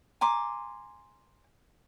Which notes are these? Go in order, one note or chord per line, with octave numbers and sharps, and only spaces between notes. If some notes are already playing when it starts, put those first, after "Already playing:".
G#5 A#5 C6 D6